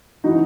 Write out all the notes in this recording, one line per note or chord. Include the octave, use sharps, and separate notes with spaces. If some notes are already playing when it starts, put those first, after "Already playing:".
E3 D#4 F#4